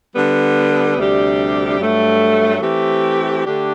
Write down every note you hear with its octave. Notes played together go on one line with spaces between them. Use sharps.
D3 G3 B3
D2 C3 G3 D4 G4
G2 F#3 A3
E3 A3 C4 G4
D3 A3 D4 G4